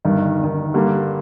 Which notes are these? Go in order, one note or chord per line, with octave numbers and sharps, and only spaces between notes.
G1 G2 D#3
G1 G2 D#3
G2 D3 G3 A#3